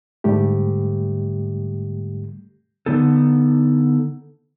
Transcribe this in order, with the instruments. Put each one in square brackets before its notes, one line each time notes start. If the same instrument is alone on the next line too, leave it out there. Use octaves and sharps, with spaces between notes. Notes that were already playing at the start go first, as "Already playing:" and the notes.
[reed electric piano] G#2 D3 G3 A3 G4
[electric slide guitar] D3 B3 D#4 A4